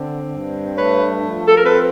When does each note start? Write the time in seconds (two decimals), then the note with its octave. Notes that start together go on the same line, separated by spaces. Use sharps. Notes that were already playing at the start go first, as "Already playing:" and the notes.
Already playing: D3 C4
0.32 G2
0.76 A3 B4 C#5
1.20 F3
1.47 A4
1.56 A#4
1.64 C4 A4 B4